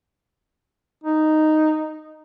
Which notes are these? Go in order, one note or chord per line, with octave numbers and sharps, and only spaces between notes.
D#4